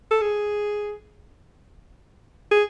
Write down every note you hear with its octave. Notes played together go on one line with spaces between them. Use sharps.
A4
G#4
G#4